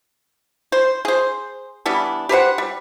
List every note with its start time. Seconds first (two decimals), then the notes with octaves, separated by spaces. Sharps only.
0.72 C5
1.05 G#4 C5
1.86 E3 G3 B3 D4
2.29 G4 B4 C5 F#5
2.58 G3